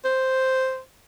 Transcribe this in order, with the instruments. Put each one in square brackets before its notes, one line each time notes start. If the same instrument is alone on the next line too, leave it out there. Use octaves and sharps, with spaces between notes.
[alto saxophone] C5